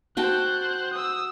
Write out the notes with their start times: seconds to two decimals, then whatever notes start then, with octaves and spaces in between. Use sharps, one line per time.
0.17 F#4 C5 G5 A5 F#6
0.93 D#6 E6